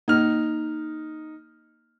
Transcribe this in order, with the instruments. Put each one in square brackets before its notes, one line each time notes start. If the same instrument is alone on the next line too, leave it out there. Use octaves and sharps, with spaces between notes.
[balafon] A#3 [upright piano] D#4 F6